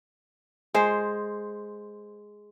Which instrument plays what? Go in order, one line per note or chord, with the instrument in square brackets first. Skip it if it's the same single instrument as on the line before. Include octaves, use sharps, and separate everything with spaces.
[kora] G#3 C5